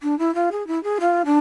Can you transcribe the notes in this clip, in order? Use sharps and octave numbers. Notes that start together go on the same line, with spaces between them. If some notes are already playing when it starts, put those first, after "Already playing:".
D4
E4
F4
G#4
E4
G#4
F4
D4